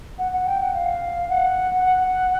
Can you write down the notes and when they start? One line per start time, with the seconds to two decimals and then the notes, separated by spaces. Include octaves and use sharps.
0.19 F#5
0.32 F#5
0.46 G5
0.60 F#5
0.74 F5
1.29 F#5
1.85 F#5